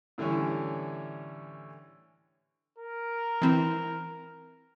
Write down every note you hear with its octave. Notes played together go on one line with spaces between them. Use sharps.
A2 D3 E3 G3 C#4
A#4
E3 C4 E4